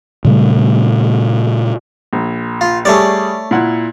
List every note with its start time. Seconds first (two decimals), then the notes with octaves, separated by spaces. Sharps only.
0.25 A#2 C#3 G3 A3
2.13 A#1
2.61 F4
2.85 G3 A3 G#4 C#5 D5
3.51 A#2 E4 F#5